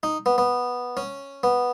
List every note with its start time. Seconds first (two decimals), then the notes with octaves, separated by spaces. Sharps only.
0.03 D#4
0.26 B3
0.38 B3
0.97 C#4
1.43 B3